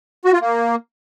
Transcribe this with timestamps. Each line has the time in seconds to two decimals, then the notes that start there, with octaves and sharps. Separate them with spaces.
0.25 F#4
0.33 F4
0.41 A#3